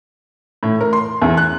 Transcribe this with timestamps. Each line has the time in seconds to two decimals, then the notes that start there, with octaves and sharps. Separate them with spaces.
0.63 A2
0.81 A#4
0.93 C6
1.22 E2
1.37 F#6